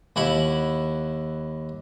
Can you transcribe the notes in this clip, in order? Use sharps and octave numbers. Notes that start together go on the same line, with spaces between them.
D#2 E4 F#5